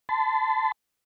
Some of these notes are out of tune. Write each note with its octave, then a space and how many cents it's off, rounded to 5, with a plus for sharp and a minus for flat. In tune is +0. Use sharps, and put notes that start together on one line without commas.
A5 +0 C6 -45